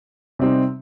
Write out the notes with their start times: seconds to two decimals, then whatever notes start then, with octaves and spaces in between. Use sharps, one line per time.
0.39 C3 G3 C4 D#4